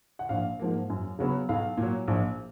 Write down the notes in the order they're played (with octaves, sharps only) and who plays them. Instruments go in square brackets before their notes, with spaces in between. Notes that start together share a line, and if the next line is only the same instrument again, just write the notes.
[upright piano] F#5
A#1 F5
G#2 F3 A#3
F#2
C#3 F#3 B3
B1 F5
A#2
F#3
A#1